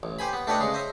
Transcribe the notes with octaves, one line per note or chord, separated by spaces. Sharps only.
A1
G4 C5 G#5 B5
B3
A3 D4 G4 B4 C#5 D#5
C#3 G#3 C6
C5 D#5 E5